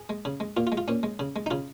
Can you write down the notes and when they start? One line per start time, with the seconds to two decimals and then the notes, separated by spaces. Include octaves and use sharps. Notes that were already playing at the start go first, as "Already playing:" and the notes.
Already playing: G#4
0.09 G#3
0.25 C#3
0.40 G#3
0.57 A#2 F4
0.67 F4
0.72 G#3
0.77 F4
0.88 A#2 C#4
1.03 G#3
1.19 C#3
1.36 G#3
1.46 D#4
1.51 C#3 F4